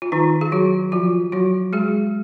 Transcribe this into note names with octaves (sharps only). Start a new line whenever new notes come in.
F4
D#3 D#4
G#4
F#3 F#4
F3 F4
F#3 F#4
G#3 G#4